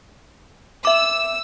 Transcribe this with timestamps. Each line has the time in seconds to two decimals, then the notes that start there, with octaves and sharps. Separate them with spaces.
0.85 E5 D6 E6